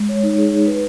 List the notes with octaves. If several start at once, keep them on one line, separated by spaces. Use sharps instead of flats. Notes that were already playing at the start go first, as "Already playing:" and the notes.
Already playing: G#3
C#5
D#4
G#4
D#4
B4